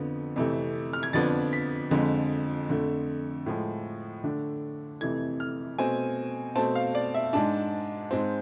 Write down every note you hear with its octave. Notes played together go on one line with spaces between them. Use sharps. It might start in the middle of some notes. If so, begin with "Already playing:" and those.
Already playing: F2 D3 F3 B3
F2 C3 E3 A3
F6
G#6
F2 D3 F3 B3 D4 A6
B6
F2 D3 F3 G#3
F2 D3 A3
A2 F3 G#3
D3 A3 D4
F2 C3 E3 A3 G#6
F6
B2 A3 C4 G#5
B2 A3 C4 A5
F5
D5
E5
G#2 G#3 D4 A5
G#2 G#3 C4